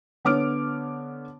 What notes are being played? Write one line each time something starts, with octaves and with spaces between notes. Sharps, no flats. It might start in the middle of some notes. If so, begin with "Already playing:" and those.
D3 B3 C#5 D6 F6 D7